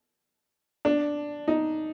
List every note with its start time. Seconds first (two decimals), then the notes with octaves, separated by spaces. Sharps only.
0.85 D4
1.48 D#4